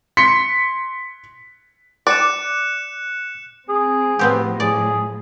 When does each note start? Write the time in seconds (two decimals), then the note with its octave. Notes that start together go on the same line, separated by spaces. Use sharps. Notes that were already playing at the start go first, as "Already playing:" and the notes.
0.17 C6 B6 C#7
2.07 D5 D6 F#6 C#7 E7
3.69 C4 G#4
4.19 A2 F3 B3 C4 G4
4.60 G#4 D5